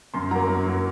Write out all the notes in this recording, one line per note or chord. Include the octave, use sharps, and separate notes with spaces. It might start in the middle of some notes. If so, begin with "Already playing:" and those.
F#2 C6
F#3 A#3 A#5
F#2
F#3 A#3